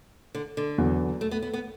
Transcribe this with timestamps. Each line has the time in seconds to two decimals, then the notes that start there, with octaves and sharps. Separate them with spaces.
0.35 D3
0.57 D3
0.78 E2 D3 F#3 B3
1.21 A3
1.31 B3
1.42 B3
1.54 B3